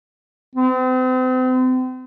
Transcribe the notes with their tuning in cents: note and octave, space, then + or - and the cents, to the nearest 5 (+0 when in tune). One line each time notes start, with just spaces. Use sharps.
C4 -40